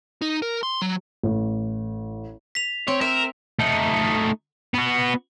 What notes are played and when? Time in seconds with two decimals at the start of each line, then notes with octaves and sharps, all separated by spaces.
0.22 D#4
0.42 A#4
0.63 C6
0.82 F#3
1.23 A1
2.55 B6 F7
2.88 C4 C#5
3.01 A#4 E5 E7
3.59 A3 D#4
4.74 B3 F#4